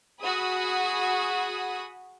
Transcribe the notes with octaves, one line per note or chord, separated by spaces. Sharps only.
F#4 G#4 B5 D#6